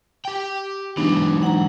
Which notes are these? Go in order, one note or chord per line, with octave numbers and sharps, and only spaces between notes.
G4 G5
E3 F#3 G#3 B3 D4 D#4
F#5 A#5